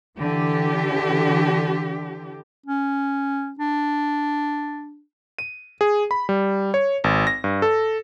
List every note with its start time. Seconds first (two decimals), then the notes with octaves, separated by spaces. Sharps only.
0.17 D3 E3 G4
2.66 C#4
3.59 D4
5.39 D#7
5.81 G#4
6.11 B5
6.29 G3
6.74 C#5
7.04 G#1
7.27 A#6
7.44 G2
7.62 A4